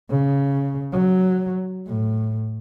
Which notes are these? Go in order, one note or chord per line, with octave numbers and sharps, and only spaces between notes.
C#3
F#3
A2